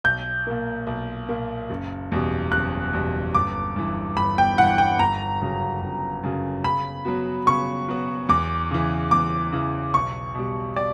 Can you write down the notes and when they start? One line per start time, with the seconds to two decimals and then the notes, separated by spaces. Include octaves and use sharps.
0.04 B1 G6
0.47 A#2 A#3
0.87 B1
1.29 A#2 A#3
1.70 F#1
2.12 E2 B2 G3
2.52 F#1 F#6
2.93 E2 B2 G3
3.35 G1 D6
3.76 G2 E3
4.17 G1 B5
4.38 G5
4.58 G2 E3 F#5
4.78 G5
4.99 G1 A#5
5.41 F#2 C#3 F#3
5.82 G1
6.23 F#2 C#3 F#3
6.64 C#3 B5
7.05 F#3 B3 F#4
7.46 C#3 C#6
7.88 F#3 B3 F#4
8.29 E2 D6
8.71 C#3 E3
9.11 E2 D6
9.52 C#3 E3
9.94 B1 C#6
10.35 B2 G3
10.76 D5